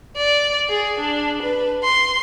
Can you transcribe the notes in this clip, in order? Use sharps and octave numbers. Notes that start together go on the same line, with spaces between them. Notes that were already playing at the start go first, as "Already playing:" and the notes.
D5
G#4
D4
B4
C6